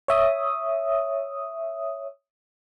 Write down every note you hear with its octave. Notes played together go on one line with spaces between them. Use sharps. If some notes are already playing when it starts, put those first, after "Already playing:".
C#5 E5 D#6